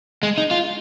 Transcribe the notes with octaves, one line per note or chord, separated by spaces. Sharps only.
G#3
D#4
F4